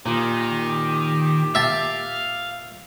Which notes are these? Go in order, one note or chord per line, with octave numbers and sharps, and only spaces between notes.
A#2 D#3 G4
E5 F5 A5